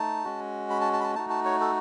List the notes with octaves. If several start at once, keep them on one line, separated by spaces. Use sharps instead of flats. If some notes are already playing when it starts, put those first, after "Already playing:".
Already playing: A3 D#4 A5
G#3 C#4 F#4
B5
A5
A5
B5
A5
A3 D#4 F#4 A5
A5
C#5
A4